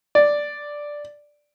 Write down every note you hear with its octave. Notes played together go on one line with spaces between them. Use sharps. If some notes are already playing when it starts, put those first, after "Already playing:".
D5